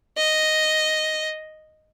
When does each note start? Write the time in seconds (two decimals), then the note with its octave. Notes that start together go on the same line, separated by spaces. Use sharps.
0.18 D#5